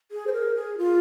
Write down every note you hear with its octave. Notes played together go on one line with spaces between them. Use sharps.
G#4
C5
A#4
G#4
F4